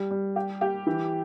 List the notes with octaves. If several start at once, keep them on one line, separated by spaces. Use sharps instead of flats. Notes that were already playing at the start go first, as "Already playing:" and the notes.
Already playing: G3
G3
G4
G4
E3